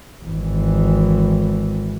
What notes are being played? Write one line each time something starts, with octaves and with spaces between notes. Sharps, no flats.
G#1 E3